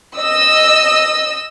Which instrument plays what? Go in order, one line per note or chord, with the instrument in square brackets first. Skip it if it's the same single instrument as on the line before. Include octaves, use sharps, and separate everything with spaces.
[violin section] D#5 E6